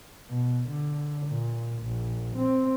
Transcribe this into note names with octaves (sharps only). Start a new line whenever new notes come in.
B2
D3
A#2
A#1
C4